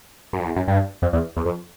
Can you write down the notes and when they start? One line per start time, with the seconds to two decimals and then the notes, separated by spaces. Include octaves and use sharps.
0.33 F#2
0.39 F2
0.45 E2
0.56 F#2
0.68 G2
1.02 F2
1.13 E2
1.37 E2
1.45 F2